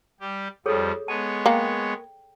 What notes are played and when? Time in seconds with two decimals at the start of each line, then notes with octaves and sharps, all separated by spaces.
0.20 G3 G4
0.66 F2 F3 G3 G#4 A4 C#5
1.08 G#3 B3 C#5 A5
1.46 A#3 G5